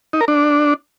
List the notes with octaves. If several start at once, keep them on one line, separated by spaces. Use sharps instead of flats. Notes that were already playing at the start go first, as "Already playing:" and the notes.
D#4
A#4
D4